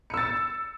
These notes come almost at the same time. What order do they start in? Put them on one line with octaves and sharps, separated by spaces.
C#7 E6 A6